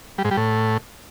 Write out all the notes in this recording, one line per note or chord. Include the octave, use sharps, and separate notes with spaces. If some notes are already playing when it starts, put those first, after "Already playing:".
G3
G#2
G3
A2